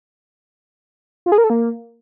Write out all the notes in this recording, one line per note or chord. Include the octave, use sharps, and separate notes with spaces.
F4
G#4
A#4
A4
A#3